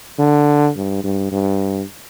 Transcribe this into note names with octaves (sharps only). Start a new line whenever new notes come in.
D3
G2
G2
G2